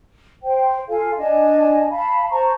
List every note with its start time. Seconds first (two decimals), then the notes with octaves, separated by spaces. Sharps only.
0.42 C5 G5
0.88 F4 A4 F5 G#5
1.17 D4 D#5 G#5 A5
1.90 F5 A5 B5
2.30 C5 A5 A#5 C#6